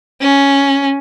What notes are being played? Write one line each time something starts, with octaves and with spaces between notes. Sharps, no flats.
C#4